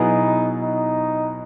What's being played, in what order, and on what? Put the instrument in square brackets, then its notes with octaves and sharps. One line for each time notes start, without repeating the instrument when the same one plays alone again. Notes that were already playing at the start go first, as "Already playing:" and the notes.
Already playing: [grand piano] B2 F#3 B3 E4 G#4 [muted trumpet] D#4
[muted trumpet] D#4